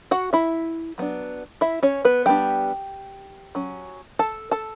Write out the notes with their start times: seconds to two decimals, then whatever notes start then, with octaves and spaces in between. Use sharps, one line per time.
0.11 F#4 F#5
0.33 E4 E5
0.98 F#3 B3 D4
1.61 E4 E5
1.83 C#4 C#5
2.05 B3 B4
2.26 G3 B3 D4 G4 G5
3.55 F#3 C#4
4.19 A4 A5
4.51 A4 A5